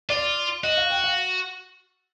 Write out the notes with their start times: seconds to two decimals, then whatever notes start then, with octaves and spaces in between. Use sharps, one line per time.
0.10 F4 D5
0.64 F#4 D#5
0.77 F5
0.90 G5
1.04 F5